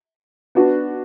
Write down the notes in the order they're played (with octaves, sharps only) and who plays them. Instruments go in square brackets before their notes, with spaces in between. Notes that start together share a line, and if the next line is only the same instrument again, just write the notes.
[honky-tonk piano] B3 D4 F#4